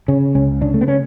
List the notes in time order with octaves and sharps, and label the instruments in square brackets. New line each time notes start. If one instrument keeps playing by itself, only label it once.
[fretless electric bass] C#3 C#4
C#2 C#4
C#3 D4
A3
B3
C#4